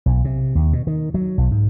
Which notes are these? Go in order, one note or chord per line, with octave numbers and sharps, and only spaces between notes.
B1
C3
D#2
B2
D#3
F#3
B1
G#2